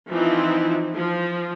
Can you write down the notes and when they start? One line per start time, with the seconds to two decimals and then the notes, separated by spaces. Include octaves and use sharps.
0.11 E3 F3 C4 D#4 E4
0.96 F3